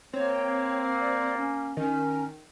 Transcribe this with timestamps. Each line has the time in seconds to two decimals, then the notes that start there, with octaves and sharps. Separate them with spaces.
0.13 A#3 C4 C#5
0.99 D5
1.37 C#4
1.77 D#3 C#4